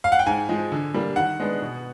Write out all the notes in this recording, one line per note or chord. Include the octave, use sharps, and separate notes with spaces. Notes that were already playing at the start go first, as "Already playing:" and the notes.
F5
F#5
G5
G#2 G#5
F3 G#3
D3
G3 A#3 D4
D#3 F#5
G#3 B3 D4
B2